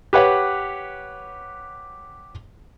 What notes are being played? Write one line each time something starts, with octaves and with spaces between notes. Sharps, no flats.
G4 B4 C#5 F#5